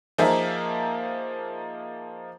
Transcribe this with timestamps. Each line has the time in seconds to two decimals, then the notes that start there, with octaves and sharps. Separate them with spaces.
0.18 F3 A#3 D#4 G#4 A#4 E5